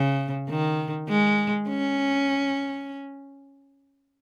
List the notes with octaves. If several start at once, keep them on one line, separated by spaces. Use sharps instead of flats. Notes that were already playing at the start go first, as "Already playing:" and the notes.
Already playing: C#3
D#3
G#3
C#4